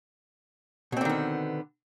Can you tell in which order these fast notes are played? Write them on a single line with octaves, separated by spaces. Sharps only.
B2 C4 D3 D#3 B3